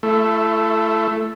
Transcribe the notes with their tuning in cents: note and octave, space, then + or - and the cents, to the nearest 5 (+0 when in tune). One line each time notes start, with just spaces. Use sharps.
A3 +0 E4 +40